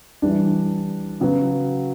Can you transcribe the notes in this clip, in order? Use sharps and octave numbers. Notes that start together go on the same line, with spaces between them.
E3 G3 D4
C#3 F#3 B3 F#4